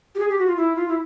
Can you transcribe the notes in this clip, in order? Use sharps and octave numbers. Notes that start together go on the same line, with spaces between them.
G4
G#4
G4
F#4
F4
E4
F4
E4